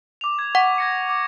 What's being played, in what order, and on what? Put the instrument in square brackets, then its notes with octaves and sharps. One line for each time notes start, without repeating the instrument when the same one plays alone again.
[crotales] D6 F7
G#6
[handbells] F#5 [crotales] C#6
[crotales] G#6 A#6 C#7
D6